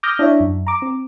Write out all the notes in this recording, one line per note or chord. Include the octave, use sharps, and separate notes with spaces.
D6 D#6 F6 G6 A#6
D4 E4 C#5 E5
F#2
A#5 D6
C4